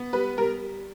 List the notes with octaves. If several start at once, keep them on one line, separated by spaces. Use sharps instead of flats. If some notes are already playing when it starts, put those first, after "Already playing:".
Already playing: B3
G3 B4
G3 A#4